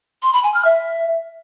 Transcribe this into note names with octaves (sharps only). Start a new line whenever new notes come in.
C6
B5
G#5
F6
E5